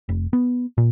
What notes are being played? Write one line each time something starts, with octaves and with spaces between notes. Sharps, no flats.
F1
B3
A#2